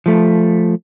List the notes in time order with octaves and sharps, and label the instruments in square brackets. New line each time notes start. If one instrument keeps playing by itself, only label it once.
[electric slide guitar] F3 A3